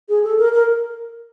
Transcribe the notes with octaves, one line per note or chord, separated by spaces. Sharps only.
G#4
A4
A#4
A#4